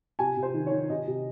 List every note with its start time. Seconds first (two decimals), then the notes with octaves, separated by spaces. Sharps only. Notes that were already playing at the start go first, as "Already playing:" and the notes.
0.19 C3 G#5
0.37 C3
0.43 C5
0.54 D#3
0.67 C#5
0.72 D#3
0.90 C3 D#5
1.07 C3